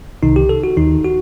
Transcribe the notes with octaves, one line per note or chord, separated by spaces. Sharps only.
C2 C3 D#3 D#4
G4
A4
F#4
D#2 D#3 D#4
F#4